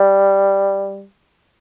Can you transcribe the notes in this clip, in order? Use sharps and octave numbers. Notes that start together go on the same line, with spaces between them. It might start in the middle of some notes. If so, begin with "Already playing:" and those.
Already playing: G3